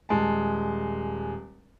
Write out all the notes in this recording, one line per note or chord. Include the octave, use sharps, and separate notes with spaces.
D#1 G#3 A5